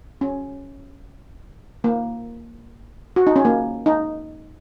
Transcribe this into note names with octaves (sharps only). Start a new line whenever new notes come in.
C#4
A#3
F#4
D#4
C#4
A#3
D#4